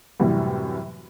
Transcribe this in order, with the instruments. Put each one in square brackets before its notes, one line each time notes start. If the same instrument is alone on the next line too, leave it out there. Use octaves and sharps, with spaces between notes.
[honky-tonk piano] F#2 A2 C3 E3 G3